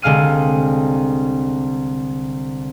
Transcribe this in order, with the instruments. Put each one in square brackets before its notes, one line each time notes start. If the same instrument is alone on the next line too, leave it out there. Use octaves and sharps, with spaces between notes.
[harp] C2 D3 G#3 F5 F6 D#7